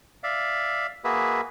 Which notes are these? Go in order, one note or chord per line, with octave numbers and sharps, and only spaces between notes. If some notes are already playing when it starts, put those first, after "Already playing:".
D5 E5 F5
A#3 F#4 G#4 B4 E5